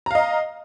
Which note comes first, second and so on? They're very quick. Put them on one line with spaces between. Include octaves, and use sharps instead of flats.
A#5 F5 D#5